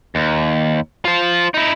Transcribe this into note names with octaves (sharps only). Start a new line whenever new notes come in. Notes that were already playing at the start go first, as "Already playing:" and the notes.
D#2
F4 C5
D#4 E4